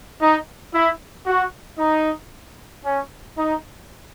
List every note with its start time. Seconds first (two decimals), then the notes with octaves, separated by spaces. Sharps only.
0.20 D#4
0.73 E4
1.26 F#4
1.78 D#4
2.84 C#4
3.37 D#4